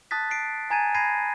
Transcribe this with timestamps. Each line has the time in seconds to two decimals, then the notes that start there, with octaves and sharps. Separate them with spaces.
0.11 A5 D#6 F#6 A6 B6
0.31 C7 D7
0.70 G#5 A#5 G#6 A6 D#7
0.95 B5 G#6 A#6 C7 D#7